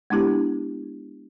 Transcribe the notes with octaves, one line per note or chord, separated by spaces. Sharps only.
G#3 B3 D4 E4 G4